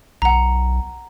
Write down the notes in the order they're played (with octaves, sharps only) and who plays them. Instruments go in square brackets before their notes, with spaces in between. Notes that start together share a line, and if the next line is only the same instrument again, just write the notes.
[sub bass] B1 [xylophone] F#5 A#5